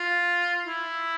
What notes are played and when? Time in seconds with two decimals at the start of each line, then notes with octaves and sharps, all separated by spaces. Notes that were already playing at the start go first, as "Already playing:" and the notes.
Already playing: F4
0.67 E4